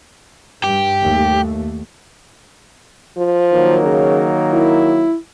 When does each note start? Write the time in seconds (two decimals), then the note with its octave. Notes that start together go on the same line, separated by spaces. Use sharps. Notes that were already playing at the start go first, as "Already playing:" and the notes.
0.64 G2 G4
1.00 D#2 A3
3.17 F3
3.52 D#3 F#3 A#3
3.83 C#3
4.53 E4